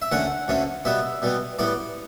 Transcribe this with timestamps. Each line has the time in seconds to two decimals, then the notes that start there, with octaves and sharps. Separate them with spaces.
0.02 E5
0.12 D2 D3 A3 C#4 F#5
0.48 D2 D3 A3 C#4
0.85 B2 G3 B3 E5
1.22 B2 G3 B3
1.59 A2 G3 B3 D5